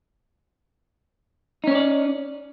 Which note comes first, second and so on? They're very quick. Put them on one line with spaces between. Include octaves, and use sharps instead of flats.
D#4 C#4 C#5 D5